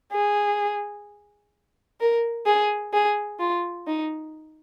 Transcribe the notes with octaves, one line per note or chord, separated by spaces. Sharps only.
G#4
A#4
G#4
G#4
F4
D#4